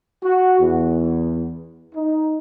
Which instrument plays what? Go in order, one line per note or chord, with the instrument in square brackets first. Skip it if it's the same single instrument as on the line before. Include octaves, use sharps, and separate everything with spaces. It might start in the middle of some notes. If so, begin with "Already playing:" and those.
[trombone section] F#4
E2
D#4